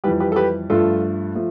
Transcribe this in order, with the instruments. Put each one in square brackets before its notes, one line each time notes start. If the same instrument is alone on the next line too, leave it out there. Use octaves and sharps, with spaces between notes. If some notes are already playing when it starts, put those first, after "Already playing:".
[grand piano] F2 E3 G3 G4 B4
G4 B4
A4
G4 B4
G2 F3 A3 F4 A4
F3 A3